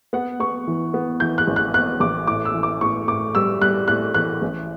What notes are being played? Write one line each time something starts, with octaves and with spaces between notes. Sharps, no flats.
B3 F#5
B3 C#6
E3
B3
E3 G6
F#6
A1
F#6
B3 F#6
A1 D6
A2 D6
E6
E3
D6
A2 C#6
A2 D6
G3 E6
G3 F#6
A2 F#6
E3 F#6
A1